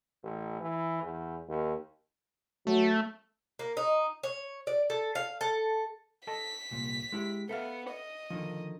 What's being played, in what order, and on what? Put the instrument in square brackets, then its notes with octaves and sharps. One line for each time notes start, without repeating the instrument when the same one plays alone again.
[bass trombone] A1
E3
E2
D#2
[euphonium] F#3 [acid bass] A3
[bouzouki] A#3
D#4
C#5
D5
A4
F5
A4
[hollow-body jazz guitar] A4 D#5 A5 [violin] B6
[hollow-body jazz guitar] C2 A#2
G#3 E4 G4
[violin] B3 [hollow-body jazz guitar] A4 E5 F5
[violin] D#5
[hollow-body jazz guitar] D3 D#3 F3